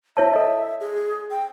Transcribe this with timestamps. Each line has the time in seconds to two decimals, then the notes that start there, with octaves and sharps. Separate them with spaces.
0.17 E4 C#5 E5 A5
0.33 A4 D#5
0.80 G#4
1.31 G5